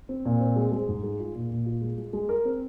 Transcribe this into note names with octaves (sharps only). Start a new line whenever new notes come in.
C4
A#2
C4
G#3
G#3
G#2
G#3
F4
A#2
A#2
F4
G#3
G#3
G#3
A#4
C4